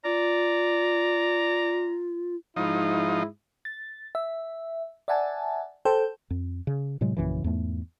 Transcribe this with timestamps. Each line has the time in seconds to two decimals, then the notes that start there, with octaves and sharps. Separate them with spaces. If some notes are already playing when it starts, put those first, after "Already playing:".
0.05 F4 D5 A#5
2.56 G#2 F3 D#4 E4
3.65 A6
4.15 E5
5.08 D5 E5 F#5 G#5 A5
5.85 A4 C5 G5
6.30 F2
6.67 C#3
7.01 A2 C3 F#3 G#3
7.17 A#1 F#2 C#3 E3
7.44 E2 G#2 A3